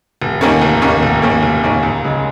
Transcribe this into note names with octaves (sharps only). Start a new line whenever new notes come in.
F1
D#2 D#3 A#3 C#4
F1
D#2 D#3 A#3 C#4
F1
D#2 D#3 A#3 C#4
F1
D#2 D#3 A#3 C#4
C#2
C#3 G#3